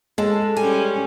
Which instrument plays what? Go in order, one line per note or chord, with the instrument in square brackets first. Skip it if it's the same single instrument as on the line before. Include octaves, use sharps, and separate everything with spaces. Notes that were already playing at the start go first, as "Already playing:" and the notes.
[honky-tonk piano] G#3 [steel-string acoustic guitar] A4
[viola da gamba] G3 C#4 [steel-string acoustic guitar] G#5